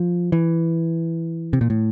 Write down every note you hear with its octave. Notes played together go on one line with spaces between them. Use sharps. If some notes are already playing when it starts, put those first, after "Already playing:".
Already playing: F3
E3
C3
A#2
A2